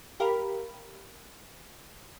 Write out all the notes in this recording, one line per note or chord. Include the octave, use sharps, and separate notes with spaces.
G4 A#4 F5 B5